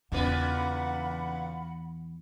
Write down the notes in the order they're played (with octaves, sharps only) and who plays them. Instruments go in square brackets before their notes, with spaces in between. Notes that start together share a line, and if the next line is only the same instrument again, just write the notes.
[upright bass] E2 E3 [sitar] A#2 C#3 B4 [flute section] F#5 B5